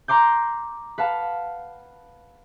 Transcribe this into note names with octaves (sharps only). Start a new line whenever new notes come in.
A#5 C6 D6 G6
B4 F5 F#5 A5